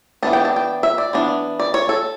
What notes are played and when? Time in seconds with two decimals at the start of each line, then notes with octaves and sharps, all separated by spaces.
0.23 E3 B3 D4 A5
0.33 G5
0.45 A5
0.56 G5
0.83 E5
0.98 D5
1.13 E3 B3 D4
1.60 D5
1.74 C#5
1.89 A4